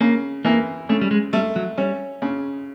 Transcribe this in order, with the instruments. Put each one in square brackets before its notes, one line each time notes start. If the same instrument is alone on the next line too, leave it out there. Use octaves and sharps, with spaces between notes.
[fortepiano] C#3 [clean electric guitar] A#3
[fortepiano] E3 [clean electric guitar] A#3
[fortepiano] C#3 [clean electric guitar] A3
[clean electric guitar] G3
G#3
[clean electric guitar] G3 [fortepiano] A3
[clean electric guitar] F#3
[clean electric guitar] G3 [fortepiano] C#4
[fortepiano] C#3